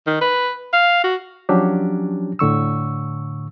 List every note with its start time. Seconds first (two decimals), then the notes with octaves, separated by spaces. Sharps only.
0.07 D#3
0.21 B4
0.74 F5
1.04 F#4
1.49 F3 F#3 C#4 D4 G4
2.39 A2 D3 C#6 E6